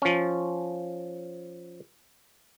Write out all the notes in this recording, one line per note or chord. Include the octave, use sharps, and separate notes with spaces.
F3 C#4